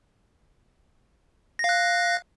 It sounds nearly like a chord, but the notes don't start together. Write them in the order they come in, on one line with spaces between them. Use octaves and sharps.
A#6 F5 F#6